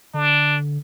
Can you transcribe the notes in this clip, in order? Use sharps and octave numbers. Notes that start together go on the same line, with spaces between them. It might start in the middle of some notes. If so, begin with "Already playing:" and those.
D3 D4